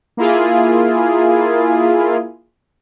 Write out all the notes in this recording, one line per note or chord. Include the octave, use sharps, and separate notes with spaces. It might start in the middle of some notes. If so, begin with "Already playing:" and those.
A#3 E4 F4 G#4